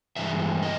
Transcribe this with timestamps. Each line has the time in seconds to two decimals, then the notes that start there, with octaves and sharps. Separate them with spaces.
0.16 G2 E3 G#3 E5
0.63 D#5